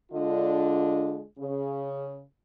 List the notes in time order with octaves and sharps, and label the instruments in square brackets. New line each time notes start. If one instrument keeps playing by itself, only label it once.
[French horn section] D3 G#3 D4 F4 D#5
C#3